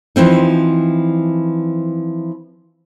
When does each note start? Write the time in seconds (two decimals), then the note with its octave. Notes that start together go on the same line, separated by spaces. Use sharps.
0.16 E3 F3 C4 D#4